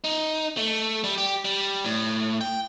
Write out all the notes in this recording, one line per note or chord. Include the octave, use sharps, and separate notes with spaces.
D#4
A3
G3
G4
G3
A2
G5